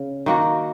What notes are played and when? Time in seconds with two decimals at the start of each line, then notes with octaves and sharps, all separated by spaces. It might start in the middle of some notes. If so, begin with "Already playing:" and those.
Already playing: C#3
0.26 D#3 A#3 F#4